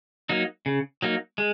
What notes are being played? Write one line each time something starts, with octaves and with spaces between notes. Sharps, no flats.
F#3 A#3 D#4
C#3
F#3 A#3 D#4
G#3